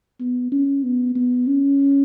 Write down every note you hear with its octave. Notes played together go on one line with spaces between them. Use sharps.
B3
C#4
B3
B3
C#4